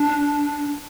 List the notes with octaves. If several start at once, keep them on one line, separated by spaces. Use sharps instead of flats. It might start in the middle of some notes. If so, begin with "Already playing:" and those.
Already playing: D4